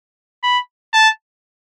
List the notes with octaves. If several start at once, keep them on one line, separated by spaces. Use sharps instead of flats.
B5
A5